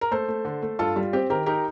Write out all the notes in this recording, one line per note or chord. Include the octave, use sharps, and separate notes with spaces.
A#4
A3 A4 C5
A3
D3
A3
G2 F4 A4
G3 F4
C4 G4
D#3 G4 A#4
D#4 G4 A#4